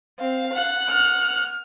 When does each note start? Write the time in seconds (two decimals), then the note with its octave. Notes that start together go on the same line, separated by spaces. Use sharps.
0.20 C4 F5
0.53 F#5 F#6
0.88 F6